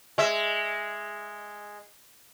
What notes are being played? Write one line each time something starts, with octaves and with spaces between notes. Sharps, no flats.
G#3 E5